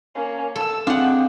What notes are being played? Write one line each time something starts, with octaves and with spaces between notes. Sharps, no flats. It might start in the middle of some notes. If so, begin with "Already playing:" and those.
A#3 C#4
A4 A5 E6
G#3 C4 D4 F4 F#5 G5 D6